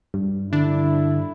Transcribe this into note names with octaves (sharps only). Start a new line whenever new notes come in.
G2
D3 D4 E4